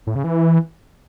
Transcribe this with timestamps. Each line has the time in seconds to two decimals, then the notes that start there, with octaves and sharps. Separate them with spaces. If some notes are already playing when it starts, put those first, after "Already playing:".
0.07 A2
0.15 C#3
0.24 E3